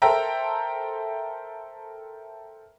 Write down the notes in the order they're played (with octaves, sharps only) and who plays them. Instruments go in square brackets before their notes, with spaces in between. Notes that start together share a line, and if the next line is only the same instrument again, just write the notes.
[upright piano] A4 A#4 C5 E5 G5 A#5